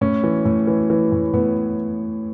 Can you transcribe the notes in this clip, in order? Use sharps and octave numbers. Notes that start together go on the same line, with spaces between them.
A2 C#4
E3
A2
E3
E3
A2
A2 B3